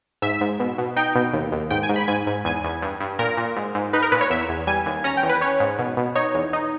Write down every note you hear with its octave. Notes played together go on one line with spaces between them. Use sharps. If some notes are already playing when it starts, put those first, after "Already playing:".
G#2 E5
G#2
B2
B2
D#4 G5
B2
D#2
D#2
G#2 G5
G#5
G#2
B5
G#2 G#5
G#2
E2 G#5
E2
G2
G2
A#2 A#4
A#2
G#2
G#2
D#4 B4
A#4
A#2 B4
C#5
E2 E5
E2
G3 G#5
D#2
C#4 A#5
G5
E2
B4
C#4 C#5
G#2
B2
B2
D#4 C#5
E2
D#4